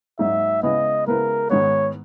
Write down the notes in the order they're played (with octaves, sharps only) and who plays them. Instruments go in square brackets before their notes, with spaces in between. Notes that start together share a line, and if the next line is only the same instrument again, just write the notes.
[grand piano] G#2 F#3 A#3 D#4 F#4 [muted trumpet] E5
[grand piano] C#3 G#3 B3 E4 B4 [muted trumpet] D#5
[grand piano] C#3 G#3 B3 E4 B4 [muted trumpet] A#4
[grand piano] G#2 D#3 G#3 B3 [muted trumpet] C#5